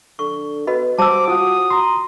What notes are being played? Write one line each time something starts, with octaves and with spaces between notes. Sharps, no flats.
D3 C#6
B3 F#4 D#5 B5
G3 F#4 C5 A5 D6 E6
F4 F#4 F#5 D#6
A#5 C6